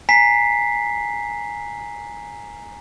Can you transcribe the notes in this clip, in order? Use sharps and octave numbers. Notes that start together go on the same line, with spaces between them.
G#5 A#5 B6 C7